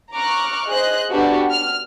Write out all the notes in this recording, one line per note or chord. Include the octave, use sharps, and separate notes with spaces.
A#5 C#6 D6 F6 F#6
G#4 C5 D#5 F#6
B3 D4 F#4 G4 A4
F6